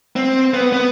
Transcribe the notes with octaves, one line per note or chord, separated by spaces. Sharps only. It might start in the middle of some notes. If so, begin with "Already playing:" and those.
C4
B3
B3